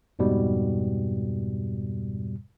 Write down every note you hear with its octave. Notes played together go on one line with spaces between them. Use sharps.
F2 G#2 B2 G3